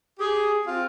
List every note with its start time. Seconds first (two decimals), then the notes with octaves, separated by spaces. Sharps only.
0.20 G4 G#4
0.67 C4 F4